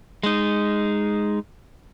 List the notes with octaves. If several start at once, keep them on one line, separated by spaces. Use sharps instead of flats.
G#3 D#4